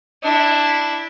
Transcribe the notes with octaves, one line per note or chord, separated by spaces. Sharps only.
D4 E4